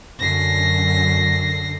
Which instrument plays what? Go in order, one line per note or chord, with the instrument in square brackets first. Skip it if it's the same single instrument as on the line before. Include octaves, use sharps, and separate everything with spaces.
[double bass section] F#2 D3 [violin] A#6 C7